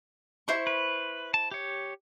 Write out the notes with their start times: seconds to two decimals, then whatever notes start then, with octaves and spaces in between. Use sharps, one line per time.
0.48 E4 C5 C#6
0.67 B4
1.34 A5
1.51 G4 C#5